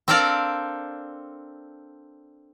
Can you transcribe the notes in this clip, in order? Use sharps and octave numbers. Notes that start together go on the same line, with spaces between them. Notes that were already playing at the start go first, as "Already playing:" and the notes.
C4 D4 A4 A#4 D5 F5